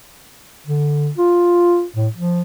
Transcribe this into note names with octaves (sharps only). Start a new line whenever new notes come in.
D3
F4
A2
F3